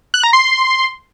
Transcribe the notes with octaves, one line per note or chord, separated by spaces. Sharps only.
F#6
A#5
C6